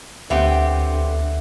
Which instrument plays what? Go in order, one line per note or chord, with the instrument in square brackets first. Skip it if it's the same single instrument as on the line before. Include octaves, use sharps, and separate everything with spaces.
[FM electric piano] D2 [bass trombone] D3 [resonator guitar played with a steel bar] B3 C4 G4 [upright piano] E5 F#5